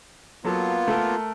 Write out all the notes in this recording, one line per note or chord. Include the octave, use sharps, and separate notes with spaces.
F#3 A#3 B3 F4 A4
A3 A4 A#4